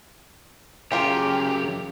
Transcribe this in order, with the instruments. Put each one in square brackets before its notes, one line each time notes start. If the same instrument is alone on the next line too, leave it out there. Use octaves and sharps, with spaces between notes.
[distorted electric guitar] F#2 G5 [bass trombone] C#3 [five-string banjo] C#4 F4 A#4 [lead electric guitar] G4